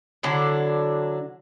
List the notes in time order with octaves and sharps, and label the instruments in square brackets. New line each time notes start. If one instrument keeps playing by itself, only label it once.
[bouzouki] D3 F#3 D4 E4